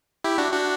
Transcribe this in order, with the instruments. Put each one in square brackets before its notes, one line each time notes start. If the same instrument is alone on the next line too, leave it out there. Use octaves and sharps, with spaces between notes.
[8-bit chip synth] E4 G4
D4 F#4
D4 F#4